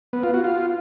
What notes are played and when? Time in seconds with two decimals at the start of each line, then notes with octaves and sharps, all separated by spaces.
0.13 B3
0.23 F4
0.34 F#4
0.44 F4